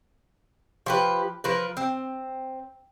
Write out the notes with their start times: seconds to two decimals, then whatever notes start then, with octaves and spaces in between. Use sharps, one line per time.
0.86 F3 G4 B4
1.44 F3 A#4 B4
1.77 C4